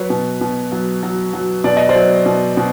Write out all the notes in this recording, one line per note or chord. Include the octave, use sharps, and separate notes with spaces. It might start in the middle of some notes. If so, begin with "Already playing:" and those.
Already playing: F#3 B4 C#5
B2
B2
F#3
F#3
F#3
B2 D5
D#5
C5 D5
F#3
B2
B2